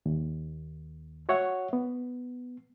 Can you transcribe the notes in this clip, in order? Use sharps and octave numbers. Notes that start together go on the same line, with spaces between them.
D#2
F#4 C#5 E5 F#5
B3